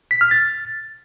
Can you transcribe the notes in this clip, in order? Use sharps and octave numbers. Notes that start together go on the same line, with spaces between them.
B6
F6
A6